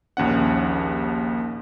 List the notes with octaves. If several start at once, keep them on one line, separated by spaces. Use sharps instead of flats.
A#1 D#2 C#4 F#5